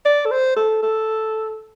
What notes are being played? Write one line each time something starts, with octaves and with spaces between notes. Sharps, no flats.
D5
A4
C5
A4
A4